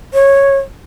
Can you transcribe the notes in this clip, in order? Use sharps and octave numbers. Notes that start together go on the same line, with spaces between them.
C#5